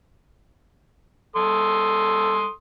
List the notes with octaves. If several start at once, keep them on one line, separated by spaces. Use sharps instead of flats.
A4 C6 D#6